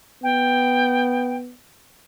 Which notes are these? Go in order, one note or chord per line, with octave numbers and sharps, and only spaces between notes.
B3 G5